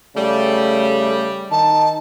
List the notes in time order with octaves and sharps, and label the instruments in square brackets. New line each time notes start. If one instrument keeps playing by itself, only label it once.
[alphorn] C#3 [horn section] G3 [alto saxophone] A3
[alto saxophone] D#3 [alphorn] D#4 [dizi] A5